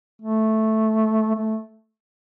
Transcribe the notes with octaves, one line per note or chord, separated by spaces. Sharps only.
A3
A3